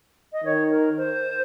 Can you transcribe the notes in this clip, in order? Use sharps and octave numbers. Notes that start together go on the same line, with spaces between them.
D#5
D#3 C#5
A#4
C5